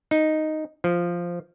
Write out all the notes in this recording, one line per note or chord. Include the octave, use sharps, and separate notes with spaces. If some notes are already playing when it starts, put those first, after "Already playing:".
D#4
F3